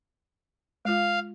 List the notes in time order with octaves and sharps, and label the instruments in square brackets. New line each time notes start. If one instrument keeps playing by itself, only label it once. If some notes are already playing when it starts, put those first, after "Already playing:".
[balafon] G#3 F4 [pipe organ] F5